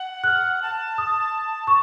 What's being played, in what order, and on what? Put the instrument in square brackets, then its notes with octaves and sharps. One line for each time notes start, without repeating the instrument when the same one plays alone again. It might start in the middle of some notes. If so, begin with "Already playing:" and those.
Already playing: [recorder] F#5
[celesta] F#6
F6
[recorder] A5
[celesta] D#6
C#6